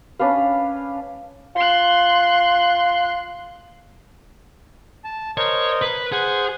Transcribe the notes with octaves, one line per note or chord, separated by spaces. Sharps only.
C#4 D4 B4 F5
F4 C6 F#6
A5
A#4 C5 C#5 D#5
B4
G#4 C5 F#5